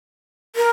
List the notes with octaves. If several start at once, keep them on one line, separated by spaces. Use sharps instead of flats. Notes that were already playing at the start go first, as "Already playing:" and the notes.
A#4